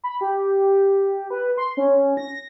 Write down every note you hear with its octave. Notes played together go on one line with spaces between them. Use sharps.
B5
G4
B4
C6
C#4
A#6